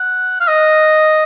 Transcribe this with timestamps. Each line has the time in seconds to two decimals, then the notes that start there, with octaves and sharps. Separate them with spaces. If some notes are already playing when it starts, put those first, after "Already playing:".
Already playing: F#5
0.40 F5
0.48 D#5